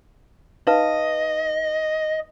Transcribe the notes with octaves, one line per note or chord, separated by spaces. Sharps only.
D#4 B4 D#5 F5